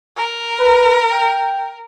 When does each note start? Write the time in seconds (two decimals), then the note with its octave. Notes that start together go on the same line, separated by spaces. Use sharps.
0.16 A#4
0.60 B4
1.11 G5